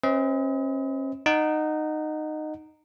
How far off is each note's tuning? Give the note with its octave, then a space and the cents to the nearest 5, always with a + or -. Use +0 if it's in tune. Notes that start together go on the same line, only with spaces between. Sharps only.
C#4 -40 B4 +40 D#5 +40
D#4 -15 F#5 +0